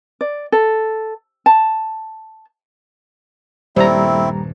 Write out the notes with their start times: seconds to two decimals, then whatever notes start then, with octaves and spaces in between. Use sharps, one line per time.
0.21 D5
0.52 A4
1.46 A5
3.76 D#1 G2 G3 A3 C4 E4 C5 A#5